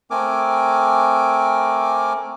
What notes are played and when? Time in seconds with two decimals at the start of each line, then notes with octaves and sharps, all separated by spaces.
0.11 A3 C4 A#4 G#5 D6